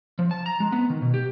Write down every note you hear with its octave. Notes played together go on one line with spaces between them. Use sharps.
F3
A5
A#5
G#3
B3
D#3
B2
G4